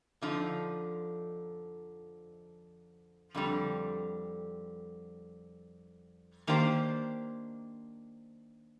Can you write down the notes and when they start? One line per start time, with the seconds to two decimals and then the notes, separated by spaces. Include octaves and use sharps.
0.22 F2 D3 F3 D#4
3.34 F2 D3 G3
6.47 D#3 A#3 D4 G4 C5